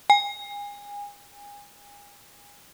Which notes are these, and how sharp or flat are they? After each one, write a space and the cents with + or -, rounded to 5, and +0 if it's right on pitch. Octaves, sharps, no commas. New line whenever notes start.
G#5 -30